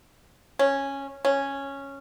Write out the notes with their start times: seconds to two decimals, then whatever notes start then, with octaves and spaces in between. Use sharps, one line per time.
0.59 C#4
1.25 C#4